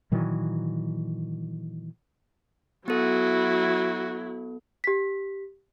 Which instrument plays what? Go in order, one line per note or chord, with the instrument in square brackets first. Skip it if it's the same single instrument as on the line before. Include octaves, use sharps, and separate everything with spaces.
[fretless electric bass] A#2 D#3 E3 F#3
[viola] F#3 E4 [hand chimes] B3 A4 [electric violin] F#4
[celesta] G4 B6